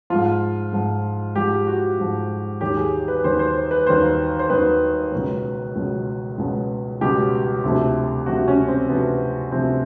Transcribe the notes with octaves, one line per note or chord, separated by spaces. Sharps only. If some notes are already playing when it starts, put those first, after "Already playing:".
G#2 F3 F4
G#2 F3
G#2 F3 G4
F#4
G#2 F3
D#2 D#3 F#3 G4
G#4
B4
D#2 D#3 F#3 C5
C5
B4
D#2 D#3 F#3 C5
C5
D#2 D#3 F#3 B4
C#2 B2 F#3
C#2 B2 F#3
C#2 B2 F#3
C#2 B2 F#3 G4
D2 C3 F3
D2 C3 F3 F#4
C#4
C4
D2 C3 F3 B3
D2 C3 F3 C4